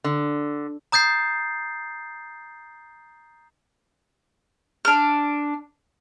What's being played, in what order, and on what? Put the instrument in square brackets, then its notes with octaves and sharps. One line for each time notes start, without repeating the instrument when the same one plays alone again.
[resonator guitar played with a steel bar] D3
[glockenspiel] A#5 D#6 G6 A6 C7
[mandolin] D4 F6